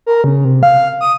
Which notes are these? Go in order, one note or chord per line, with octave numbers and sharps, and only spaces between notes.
A#4
C#3
C3
F5
D#6